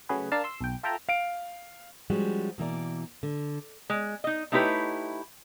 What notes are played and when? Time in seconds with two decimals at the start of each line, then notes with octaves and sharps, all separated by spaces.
0.09 C#3 F#3 A3 F#4 G#4 B4
0.32 D4 A#4 F5 A5
0.44 C6 E6
0.61 B1 G5
0.83 F4 A4 E5 G5 A5 A#5
1.09 F5 D7
2.10 F3 G3 G#3 C#4 F#4
2.58 B2 E3 A#3 D5
3.23 D3
3.90 G#3
4.24 D#4 D#5
4.52 A3 D#4 E4 G4 B4 C#5